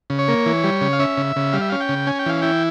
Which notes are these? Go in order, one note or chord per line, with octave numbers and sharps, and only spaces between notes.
C#3
C#5
A#3
E3
G3
C#3
F5
C#4 E5
C#3
C#3
G3 F5
E5
C#4 F5
G5
C#3
C#4 G#5
G5
E3 F5
E4 G5